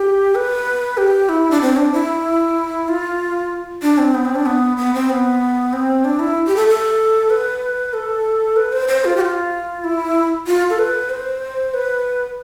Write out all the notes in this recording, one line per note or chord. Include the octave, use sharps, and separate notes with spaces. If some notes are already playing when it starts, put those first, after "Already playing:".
Already playing: G4
B4
G4
E4
D4
C4
D4
E4
F4
D4
C4
B3
C4
D4
B3
B3
C4
B3
C4
D4
E4
G4
A4
A4
B4
A4
B4
C5
C5
F4
G4
F4
E4
F4
A4
B4
C5
B4